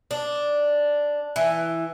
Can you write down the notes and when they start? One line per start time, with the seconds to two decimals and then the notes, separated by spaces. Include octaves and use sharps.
0.11 D4
1.36 E3